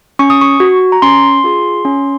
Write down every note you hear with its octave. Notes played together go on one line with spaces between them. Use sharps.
C#4 C#6
D#6
C#6
F#4
A#5
C#4 C6
F4 G#4
C#4